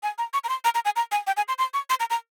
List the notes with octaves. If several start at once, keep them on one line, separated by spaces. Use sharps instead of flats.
G#5
A#5
C#6
A#5
C6
A#5
A#5
G#5
A#5
G#5
G5
G#5
C6
C6
C#6
C6
A#5
A#5